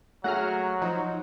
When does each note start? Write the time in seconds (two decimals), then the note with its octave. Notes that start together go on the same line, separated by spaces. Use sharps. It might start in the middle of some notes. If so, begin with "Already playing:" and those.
0.24 F#3 A3 F#4 G#4 F#5 A#5 F6
0.82 F3 D#4